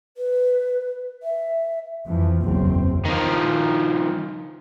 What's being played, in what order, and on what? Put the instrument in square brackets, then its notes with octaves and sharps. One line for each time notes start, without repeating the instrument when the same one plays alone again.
[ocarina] B4
E5
[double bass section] F2 E3 F3
F#1 B1 E2 C4
[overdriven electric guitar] D#3 F3